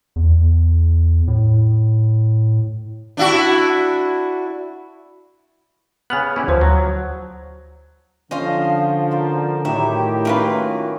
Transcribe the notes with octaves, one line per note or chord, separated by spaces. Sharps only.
E2
A2
D4 E4 F#4
C#3 B3 G#5 F6 F#6
C#4 E4 G4
D2 F3 C5
F#3
D3 F3 C#4 C5 D#5 F5
A#4 C5 D5
A2 D#3 F#3 E4 G4 E5
D#3 A#3 C#4 D#4 F4 B4